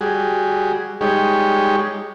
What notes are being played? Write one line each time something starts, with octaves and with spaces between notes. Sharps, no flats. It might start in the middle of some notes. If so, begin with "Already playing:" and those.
G3 F#4 G#4
G3 G#3 D#4 G4 C#5